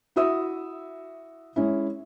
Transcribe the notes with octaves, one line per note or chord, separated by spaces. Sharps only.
E4 F#4 E5 D#6 E6
G#3 C#4 E4